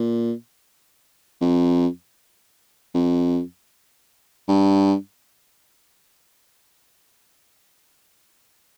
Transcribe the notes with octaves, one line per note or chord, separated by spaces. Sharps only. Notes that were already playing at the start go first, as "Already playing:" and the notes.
Already playing: A#2
F2
F2
G2